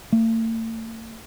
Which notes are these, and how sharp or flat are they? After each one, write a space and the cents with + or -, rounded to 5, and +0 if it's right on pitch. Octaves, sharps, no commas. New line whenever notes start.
A3 +45